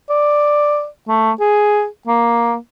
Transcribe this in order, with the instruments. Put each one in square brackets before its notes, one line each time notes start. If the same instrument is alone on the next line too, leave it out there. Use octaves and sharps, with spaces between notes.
[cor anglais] D5
A3
G#4
A#3